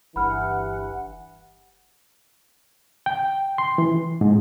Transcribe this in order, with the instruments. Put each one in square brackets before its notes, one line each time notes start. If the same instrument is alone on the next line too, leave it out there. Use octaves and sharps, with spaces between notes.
[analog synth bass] G1 [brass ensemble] G2 E3 [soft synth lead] F#5 [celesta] B5 F6
[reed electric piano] G5
C6
E3
G#2